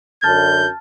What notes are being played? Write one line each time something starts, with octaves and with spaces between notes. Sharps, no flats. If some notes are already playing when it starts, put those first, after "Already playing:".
F#2 D3 A5 F6 G6 A6